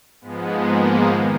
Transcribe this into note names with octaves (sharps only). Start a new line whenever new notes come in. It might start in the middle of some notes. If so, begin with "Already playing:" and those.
G#2 F3 G#3 B3
A#3
F2 D#3